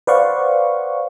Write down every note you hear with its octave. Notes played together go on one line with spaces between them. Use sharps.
B4 C5 D5 F5 F#5 C#6